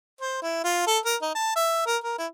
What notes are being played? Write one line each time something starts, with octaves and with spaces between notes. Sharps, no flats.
C5
E4
F4
A4
A#4
D#4
A5
E5
A#4
A#4
E4